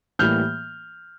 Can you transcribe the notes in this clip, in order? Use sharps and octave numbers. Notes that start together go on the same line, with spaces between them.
A2 E3 G3 A#3 F6 G6